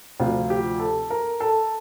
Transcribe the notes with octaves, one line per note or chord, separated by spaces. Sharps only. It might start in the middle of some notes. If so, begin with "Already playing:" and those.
D2 C3 F3 F4
G4
A4
A#4
A4